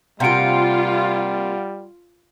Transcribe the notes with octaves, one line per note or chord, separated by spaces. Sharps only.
C3 G3 A#3 F4 F5 F#5 D7